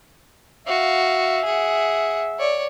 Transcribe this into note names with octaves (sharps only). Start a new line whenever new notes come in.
F#4 E5 F5
G#4 F#5
C#5 D5